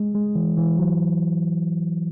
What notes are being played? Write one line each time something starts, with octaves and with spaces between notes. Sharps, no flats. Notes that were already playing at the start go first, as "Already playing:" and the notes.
Already playing: G#3
G#3
E3
E3
F#3